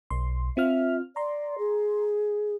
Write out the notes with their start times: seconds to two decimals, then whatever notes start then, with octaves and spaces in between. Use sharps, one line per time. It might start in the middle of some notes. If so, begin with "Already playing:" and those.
0.10 B1 C6
0.57 C4 F4 E5 F6
1.16 D5 A#5 C6
1.58 G#4